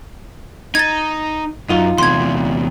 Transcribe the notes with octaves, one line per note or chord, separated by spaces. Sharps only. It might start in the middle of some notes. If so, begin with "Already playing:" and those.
D#4 G#6 A6
F#2 D#4 F4
E2 C3 C6 G#6